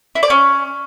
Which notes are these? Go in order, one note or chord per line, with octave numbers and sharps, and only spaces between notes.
E4
D5
C#4